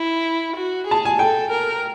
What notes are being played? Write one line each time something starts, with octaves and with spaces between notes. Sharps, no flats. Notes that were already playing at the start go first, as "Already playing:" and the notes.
Already playing: E4
F#4
G#4 A5
G#5
A4 G5
A#4